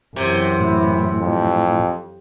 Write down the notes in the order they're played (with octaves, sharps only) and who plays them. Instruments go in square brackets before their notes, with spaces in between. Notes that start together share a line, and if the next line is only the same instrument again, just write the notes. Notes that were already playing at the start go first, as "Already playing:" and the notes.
[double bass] F#2 E3 [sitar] C3 [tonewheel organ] G6 G#6
[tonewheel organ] A2 [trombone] E4
[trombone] F2